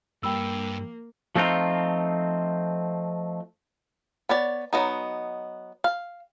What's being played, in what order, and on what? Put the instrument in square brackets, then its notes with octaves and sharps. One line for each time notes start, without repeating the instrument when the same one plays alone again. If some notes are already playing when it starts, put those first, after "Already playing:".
[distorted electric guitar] G2 [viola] A#3 [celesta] G5 B5 E6
[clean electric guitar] F3 A3 C4 D#4 F4
[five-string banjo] B3 C#5 D5
F#3 B3 D#4
F5